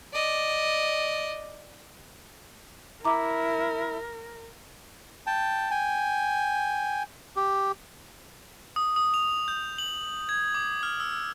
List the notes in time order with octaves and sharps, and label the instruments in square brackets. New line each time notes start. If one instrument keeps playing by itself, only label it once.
[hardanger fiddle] D5 D#5
[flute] E4 [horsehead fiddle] A#4 [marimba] A#5 D6
[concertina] G5 A5
G5 G#5
G4
[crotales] D#6
D#6
F7
G6
F#7
G#6
D6
F6
E6
E6